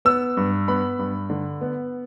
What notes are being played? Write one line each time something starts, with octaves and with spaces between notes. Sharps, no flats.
B3 E6
G2
B3 B5
G2
D3
B3